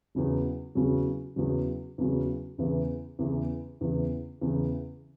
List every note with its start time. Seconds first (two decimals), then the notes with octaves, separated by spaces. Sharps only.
0.15 E2 C#3 F#3
0.75 E2 C#3 F#3
1.36 E2 C#3 F#3
1.98 E2 C#3 F#3
2.58 E2 C#3 E3
3.19 E2 C#3 E3
3.81 E2 C#3 E3
4.41 E2 C#3 E3